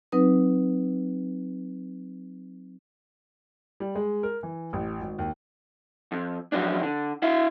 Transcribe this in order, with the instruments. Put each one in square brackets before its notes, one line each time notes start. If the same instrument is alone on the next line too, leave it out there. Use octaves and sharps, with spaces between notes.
[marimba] F#3 C4 D#4 B4 D#6
[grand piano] G3
G#3
A#4
E3
A1
G#1
D#2
[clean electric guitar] F2
F3 F#3 C#4 D4
D3
E4 E5 F5